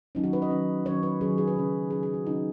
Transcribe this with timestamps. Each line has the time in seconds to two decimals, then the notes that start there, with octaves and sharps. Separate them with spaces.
0.15 D#3 F#3 C#4 D#4
0.24 F#4
0.33 B4
0.42 D#5
0.50 D#3 F#3 C#4
0.85 D#3 F#3 C#4 C#5
1.03 B4
1.21 D#3 F#3 C#4 G#4
1.38 G#4
1.48 B4
1.56 C#3 F#3 C#4
1.90 C#3 F#3 C#4 G#4
2.03 G#4
2.14 F#4
2.26 C#3 F#3 C#4 D#4